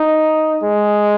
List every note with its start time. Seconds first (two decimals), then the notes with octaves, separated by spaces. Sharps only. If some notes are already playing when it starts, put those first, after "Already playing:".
Already playing: D#4
0.63 G#3